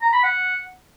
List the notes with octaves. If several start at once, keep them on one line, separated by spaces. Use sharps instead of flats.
A#5
B5
F#5